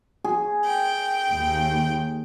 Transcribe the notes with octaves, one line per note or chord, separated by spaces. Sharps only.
G#4
G5
D#2